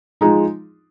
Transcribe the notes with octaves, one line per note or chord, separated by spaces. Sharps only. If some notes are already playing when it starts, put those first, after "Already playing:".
F3 G#3 D#4